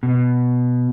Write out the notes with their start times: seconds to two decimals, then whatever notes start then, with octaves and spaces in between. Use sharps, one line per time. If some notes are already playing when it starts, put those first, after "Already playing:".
0.03 B2